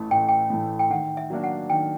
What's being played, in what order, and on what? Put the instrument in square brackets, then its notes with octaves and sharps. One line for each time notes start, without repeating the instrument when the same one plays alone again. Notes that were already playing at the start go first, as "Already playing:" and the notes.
Already playing: [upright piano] A1 A2 E3 A3
[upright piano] A1 [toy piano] G5
[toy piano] G5
[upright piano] A2 E3 A3
[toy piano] G5
[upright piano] D#3 [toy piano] F#5
[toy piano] E5
[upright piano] F#3 A#3 D4 F#4
[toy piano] F#5
[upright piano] D#3 [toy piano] G5